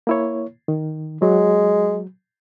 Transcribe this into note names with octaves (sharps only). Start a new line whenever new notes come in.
A#3 E4 C#5
D#3
F#3 G#3